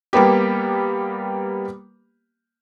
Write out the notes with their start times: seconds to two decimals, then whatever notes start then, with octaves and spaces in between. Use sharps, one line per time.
0.13 G3 A#3 B3 G4